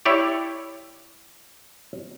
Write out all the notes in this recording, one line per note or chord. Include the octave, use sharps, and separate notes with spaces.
E4 G4 C#5 D5